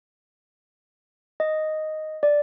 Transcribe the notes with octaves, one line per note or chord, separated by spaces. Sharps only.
D#5
D5